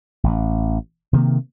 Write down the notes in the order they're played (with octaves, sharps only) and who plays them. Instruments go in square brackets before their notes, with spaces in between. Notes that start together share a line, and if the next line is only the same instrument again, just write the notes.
[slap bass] A1
C3 D#3 G3 A#3